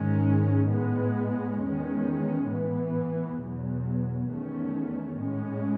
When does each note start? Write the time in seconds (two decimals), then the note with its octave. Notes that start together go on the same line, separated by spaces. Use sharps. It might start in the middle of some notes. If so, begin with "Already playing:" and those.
Already playing: G#2 D#3 G#3 C#4
0.67 A2 G#3 B3
1.57 E2 D#3 G#3 C#4
2.47 A2 E3 B3
3.38 E2 B2 F#3
4.28 E2 D#3 A3 C#4
5.17 A2 G#3 C#4